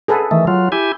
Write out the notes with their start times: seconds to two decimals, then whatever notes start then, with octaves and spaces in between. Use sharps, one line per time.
0.08 G#4 A4 B4
0.31 D#3 E3 A3
0.47 F#3 F4
0.72 E4 G4 G#5